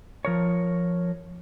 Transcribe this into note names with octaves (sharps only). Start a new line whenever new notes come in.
F3 A#4 C#5